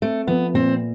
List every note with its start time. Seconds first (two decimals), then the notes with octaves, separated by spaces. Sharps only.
0.02 A3 C4
0.27 F3 B3
0.54 A#2 C4